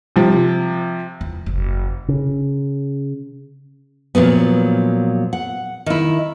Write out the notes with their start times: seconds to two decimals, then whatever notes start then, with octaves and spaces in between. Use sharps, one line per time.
0.16 C3 F3
1.21 E2
1.46 F#1
2.08 C#3
4.15 A#2 F3 F#3 B3
5.33 F#5
5.86 D#3 E4